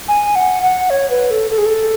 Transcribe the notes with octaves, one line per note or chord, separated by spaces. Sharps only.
G#5
F#5
F#5
C#5
B4
A4
A4
G#4
A4